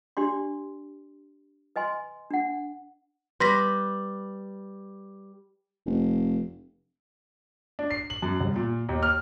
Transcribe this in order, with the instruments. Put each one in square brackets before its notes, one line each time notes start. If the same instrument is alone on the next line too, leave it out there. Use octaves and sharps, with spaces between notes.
[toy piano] D4 G4 D5 C6
B4 D#5 G#5 C6
D4 F#5
[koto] G3 [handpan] B4 [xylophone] C6 A#6 B6
[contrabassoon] F1
[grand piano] D4
C7
F#7
F#2
C2
A#2
D#2
F6